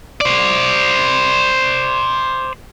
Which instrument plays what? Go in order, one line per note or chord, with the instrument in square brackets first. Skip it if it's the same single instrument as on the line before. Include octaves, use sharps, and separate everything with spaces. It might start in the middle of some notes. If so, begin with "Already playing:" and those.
[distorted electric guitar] C5 D5